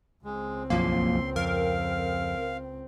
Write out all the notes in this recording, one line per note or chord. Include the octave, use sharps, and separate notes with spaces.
C#2 G#3 C4
B1 F#2 F3 A#3 C6
F2 A#4 F5